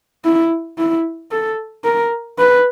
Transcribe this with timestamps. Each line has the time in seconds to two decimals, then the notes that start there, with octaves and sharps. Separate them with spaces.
0.25 E4
0.78 E4
1.31 A4
1.84 A#4
2.39 B4